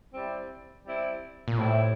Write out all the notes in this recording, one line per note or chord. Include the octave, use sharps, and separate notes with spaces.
G3 C4 E4
G3 C4 E4
A#2
A2 G3 C4 E4